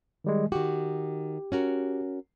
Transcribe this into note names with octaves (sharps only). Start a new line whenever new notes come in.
D#3 G3 G#3
D#3 F#4 G4
C#4 F#4 A#4